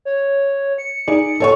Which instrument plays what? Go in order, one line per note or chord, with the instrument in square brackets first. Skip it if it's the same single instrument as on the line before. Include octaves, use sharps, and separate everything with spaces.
[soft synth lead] C#5
C#7
[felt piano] D#4 G#4 D5
A4 C#5 C#6